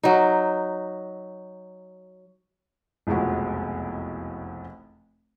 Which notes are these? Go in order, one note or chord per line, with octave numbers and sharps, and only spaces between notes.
F#3 D#4
F1 B1 E2 F3 G#3 F#4